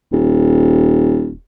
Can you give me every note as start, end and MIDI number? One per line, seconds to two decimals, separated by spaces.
0.12 1.35 27